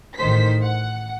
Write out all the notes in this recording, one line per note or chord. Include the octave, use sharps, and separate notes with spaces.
A1 D#3 C5 B6
F#5